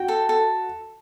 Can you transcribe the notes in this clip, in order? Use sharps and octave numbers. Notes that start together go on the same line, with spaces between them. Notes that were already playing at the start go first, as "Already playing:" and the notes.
Already playing: F#4 G5
A4
A4